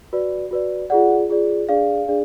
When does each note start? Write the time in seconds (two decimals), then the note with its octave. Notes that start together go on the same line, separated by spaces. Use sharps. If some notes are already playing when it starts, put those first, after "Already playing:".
0.13 F#4 B4 D5
0.51 F#4 B4 D5
0.90 F4 G#4 D5 F#5
1.29 F4 G#4 D5
1.69 D4 G#4 D5 F5
2.08 D4 G#4 D5